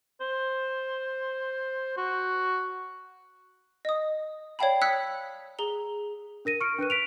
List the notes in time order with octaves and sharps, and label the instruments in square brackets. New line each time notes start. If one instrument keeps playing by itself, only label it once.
[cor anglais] C5
F#4
[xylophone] D#5 D#6
C#5 D5 F5 G5 A5 B5
D#6 E6 F#6 G#6 B6 C#7
G#4 A#5 G7
[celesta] D4 A#4 A#6 D#7
C#6 F6 C#7 D7
D4 B4 F#6 D#7
B6 D7 F7